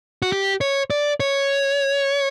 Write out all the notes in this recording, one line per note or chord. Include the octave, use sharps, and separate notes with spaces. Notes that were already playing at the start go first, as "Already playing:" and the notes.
F#4
G4
C#5
D5
C#5